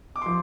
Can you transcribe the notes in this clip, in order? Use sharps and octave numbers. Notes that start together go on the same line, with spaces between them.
D6
F3 C6